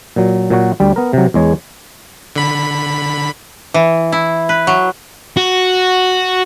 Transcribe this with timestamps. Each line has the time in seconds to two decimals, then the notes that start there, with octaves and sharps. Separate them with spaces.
0.16 A#2 F#3
0.50 A#2 F#3 F#4
0.80 D2 G3
0.96 B3 A#4
1.13 C3 F#3
1.34 E2 G#3 C#5
2.36 D3 B5
3.74 E3
4.12 E4
4.49 B4
4.67 F#3
5.37 F#4